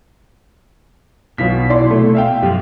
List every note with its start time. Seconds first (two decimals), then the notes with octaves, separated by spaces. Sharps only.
1.38 B1 B2 F4 B6
1.69 E4 D5 C6
1.91 A3
2.15 E5 F5 G5
2.43 F#2 F3 G4